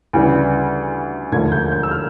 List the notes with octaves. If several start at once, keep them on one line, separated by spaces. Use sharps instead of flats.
D2 C#3 E3 G3
E1 D#2 D3 F3 A3 G#6
G6
G6
E6
F6